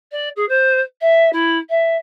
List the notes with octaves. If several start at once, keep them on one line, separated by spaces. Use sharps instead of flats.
D5
G#4
C5
E5
E4
E5